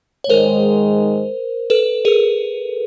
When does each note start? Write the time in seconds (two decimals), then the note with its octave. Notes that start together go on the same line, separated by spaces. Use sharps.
0.24 C#5
0.29 G#2 D#3 G#3 A#4 C5
1.70 A4 B4
2.05 G#4 A#4